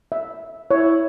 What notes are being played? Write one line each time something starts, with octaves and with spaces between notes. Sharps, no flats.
E5
E4 C#5